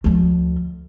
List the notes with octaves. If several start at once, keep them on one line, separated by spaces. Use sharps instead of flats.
D2 F3